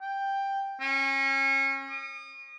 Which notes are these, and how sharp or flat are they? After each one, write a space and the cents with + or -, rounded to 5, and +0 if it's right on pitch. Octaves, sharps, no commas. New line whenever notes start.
G5 +5
C#4 -30
D#6 -35